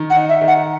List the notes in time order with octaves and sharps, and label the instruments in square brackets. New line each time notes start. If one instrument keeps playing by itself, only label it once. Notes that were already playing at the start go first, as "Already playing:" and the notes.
Already playing: [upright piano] D#3
[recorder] F#5
[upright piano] D#4
[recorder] E5
[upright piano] D#3
[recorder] F#5